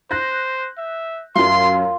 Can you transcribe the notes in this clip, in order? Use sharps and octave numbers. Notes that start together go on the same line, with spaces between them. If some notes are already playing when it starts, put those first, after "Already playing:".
C5 F#6 G6 A#6
E5
F#2 F#3 F4 C6